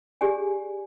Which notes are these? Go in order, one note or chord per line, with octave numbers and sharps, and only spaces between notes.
G4 G#4 D5 G#5